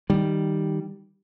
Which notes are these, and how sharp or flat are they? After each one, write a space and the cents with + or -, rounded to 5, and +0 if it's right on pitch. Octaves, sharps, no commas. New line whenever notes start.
D#3 +0 G3 +0